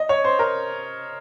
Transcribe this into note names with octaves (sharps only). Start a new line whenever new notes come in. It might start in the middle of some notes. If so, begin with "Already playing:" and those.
Already playing: D#5
C#5
C5
A#4